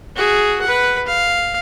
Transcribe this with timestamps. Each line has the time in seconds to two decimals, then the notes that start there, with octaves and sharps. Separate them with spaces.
0.16 F#4 G#4
0.62 B4 F#5
1.06 F5